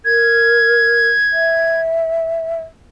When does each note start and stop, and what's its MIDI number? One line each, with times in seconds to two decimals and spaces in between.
0.05 1.08 70
0.05 1.80 92
1.33 2.59 76